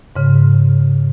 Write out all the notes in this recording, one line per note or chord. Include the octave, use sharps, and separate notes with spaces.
G#2 C#3